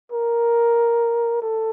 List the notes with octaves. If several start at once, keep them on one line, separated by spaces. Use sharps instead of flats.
A#4
A4